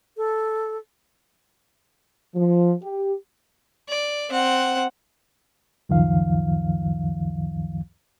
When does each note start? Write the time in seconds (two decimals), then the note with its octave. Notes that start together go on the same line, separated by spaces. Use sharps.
0.17 A4
2.35 F3
2.82 G4
3.89 D5
4.30 C4 F#5
5.89 C#2 F#2 D#3 F3 F5